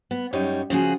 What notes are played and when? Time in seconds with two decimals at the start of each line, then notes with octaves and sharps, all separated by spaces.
0.11 B3
0.33 F#2 G3 D#4 C#5
0.70 C#3 F3 F#4 G#4